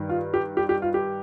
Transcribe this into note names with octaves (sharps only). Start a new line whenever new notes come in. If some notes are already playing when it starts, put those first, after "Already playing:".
Already playing: G2 D#3
F4
G4
G4
G4
F4
G4